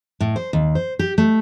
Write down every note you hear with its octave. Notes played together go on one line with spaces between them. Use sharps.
A2
C5
D#2
C5
G4
A3